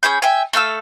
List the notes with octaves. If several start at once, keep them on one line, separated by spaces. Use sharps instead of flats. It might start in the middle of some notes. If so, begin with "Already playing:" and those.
C#4 G#4 B5 G6
E5 G5 G#5
A3 A4 F5 E6